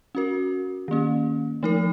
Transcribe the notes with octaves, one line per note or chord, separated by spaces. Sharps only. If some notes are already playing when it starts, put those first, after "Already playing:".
C#4 F#4 A#4
D#3 A#3 C#4
F3 A3 D#4 A#4